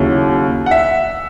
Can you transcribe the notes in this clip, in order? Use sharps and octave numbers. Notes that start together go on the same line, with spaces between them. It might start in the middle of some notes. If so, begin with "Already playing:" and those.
Already playing: D#2 C#3 F#3 C#4 E4
F#5
E5